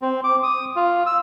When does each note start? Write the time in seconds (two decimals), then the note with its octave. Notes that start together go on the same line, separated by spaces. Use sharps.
0.02 C4
0.24 D6
0.43 D#6
0.76 F4
1.06 E6